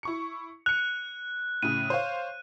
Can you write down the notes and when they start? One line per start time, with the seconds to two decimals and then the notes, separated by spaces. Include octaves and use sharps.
0.03 E4 C#6 C#7
0.66 F#6 C#7 F7
1.63 A2 C#3 D#7
1.90 C5 C#5 F5